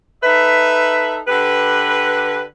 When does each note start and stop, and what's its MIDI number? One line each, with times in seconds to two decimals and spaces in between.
0.23 1.19 63
0.23 1.19 69
0.23 1.19 71
0.23 1.19 76
1.28 2.43 50
1.28 2.43 67
1.28 2.43 71